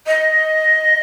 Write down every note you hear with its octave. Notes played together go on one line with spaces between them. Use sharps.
D#5